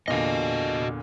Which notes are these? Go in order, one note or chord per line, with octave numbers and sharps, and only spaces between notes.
E2 A#2 D3 F#4 D#5